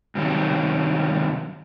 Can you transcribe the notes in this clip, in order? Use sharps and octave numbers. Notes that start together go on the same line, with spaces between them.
G2 C3 D#3 F#3